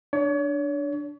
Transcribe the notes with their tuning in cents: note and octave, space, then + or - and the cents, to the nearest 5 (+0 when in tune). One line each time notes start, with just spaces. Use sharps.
D4 +0 C#5 +35